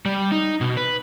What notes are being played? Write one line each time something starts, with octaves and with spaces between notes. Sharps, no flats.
G3
D#4
B2
B4